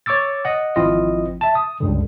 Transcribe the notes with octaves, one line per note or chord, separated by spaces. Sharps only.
C#5 C#6 D6 E6 A6
D#5 F#5
G#1 F3 C4 E4 F4 D#5
E5 A5
D#6
C#2 G2 D3